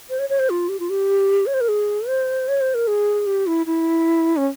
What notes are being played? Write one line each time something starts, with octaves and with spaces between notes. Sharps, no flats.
C5
C#5
C#5
C5
F4
G4
F4
G4
C#5
C5
A#4
G#4
C5
C#5
C5
A#4
G#4
G4
E4
E4
C#4